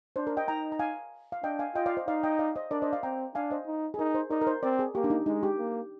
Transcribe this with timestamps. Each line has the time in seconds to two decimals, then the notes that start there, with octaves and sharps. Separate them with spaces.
0.16 D4 C5
0.27 A#4
0.37 D#5 G5
0.48 D#4 G5 A#5
0.72 A#5
0.79 F5 G#5
1.32 F5
1.43 D4 D#5 G5
1.59 F5 G#5
1.75 F4 D#5 G5
1.86 D5 F5
1.97 C5 D#5
2.08 D#4 D5 F5
2.23 D#5 G5
2.39 D5 F5
2.56 C5 D#5
2.71 D4 A#4 D5
2.82 C5 D#5
2.93 D5 F5
3.03 C4 G5 A#5
3.35 D4 F5 G#5
3.51 C5 D#5
3.67 D#4
3.94 G#4
3.99 D#4 A#4
4.15 C5
4.31 D#4 A#4 D5
4.41 A#4
4.47 C5
4.63 C4 A#4 D5
4.79 G#4
4.95 A#3 G4
5.04 D4
5.10 D#4
5.26 G#3 D#4
5.43 G4
5.58 A#3